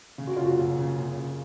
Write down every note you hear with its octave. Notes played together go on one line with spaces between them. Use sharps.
C#3
F#4
F#1 F4
F#4
F#1
C#3
F#1
F#1